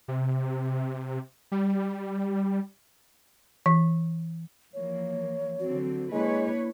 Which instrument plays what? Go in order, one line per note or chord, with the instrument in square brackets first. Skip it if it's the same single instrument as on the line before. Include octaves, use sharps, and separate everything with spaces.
[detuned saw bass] C3
G3
[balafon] E3
[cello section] E3 F3 A#3 [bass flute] C#5
[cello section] D3 F#3 C4 [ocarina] F#4
[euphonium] G#3 [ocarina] A#3 [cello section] D4 B4 C#5 [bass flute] E4